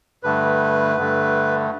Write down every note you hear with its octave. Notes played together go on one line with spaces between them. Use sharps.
G2 D3 A3 B4
G2 D3 A3